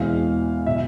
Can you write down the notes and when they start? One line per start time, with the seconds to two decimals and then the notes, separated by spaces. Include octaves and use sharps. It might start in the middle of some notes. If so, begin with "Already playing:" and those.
Already playing: E2 B2 G#3 C4 E4 F5
0.66 B2 F#3 E5